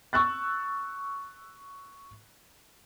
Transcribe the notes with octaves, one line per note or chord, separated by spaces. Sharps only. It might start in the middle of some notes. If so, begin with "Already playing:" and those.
C#6 E6 F#6 A6